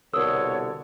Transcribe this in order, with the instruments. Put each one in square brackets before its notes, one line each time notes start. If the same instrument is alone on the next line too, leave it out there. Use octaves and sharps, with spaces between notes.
[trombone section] C2 B2 D3 [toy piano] A4 A#4 [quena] C#5 [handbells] E6